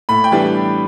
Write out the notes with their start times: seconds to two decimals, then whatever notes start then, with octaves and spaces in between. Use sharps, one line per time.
0.09 A2 B5
0.24 G5
0.32 E3 G3 B3 D4